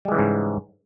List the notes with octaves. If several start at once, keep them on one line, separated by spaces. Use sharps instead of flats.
G#2 C#3 E3 G3 G#3